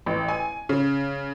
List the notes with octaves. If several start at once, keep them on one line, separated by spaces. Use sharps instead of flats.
A1
G#5
C#3